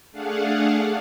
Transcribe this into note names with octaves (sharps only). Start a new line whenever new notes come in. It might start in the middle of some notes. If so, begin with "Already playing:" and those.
A3 D4 G#4 F5 F#5